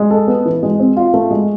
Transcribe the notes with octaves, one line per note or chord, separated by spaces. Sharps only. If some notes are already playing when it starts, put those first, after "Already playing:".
Already playing: G#3
A4
B3
E3
G#3
C4
F4
A3
G#3